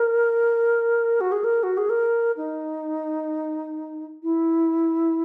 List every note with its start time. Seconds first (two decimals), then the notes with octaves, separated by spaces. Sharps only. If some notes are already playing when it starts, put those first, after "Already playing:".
Already playing: A#4
1.21 F#4
1.32 G#4
1.44 A#4
1.63 F#4
1.77 G#4
1.89 A#4
2.37 D#4
4.23 E4